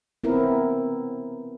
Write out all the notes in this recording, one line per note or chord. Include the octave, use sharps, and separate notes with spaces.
B3 C4 E4 A#4